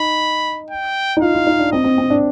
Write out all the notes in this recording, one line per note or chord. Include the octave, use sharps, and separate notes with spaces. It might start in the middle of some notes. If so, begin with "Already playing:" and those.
Already playing: D#4 B5
G5
D#4
F4 F5
F4
D#4
D4
C4 D#5
C4
C4
D4